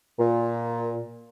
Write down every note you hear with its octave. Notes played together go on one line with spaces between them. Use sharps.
A#2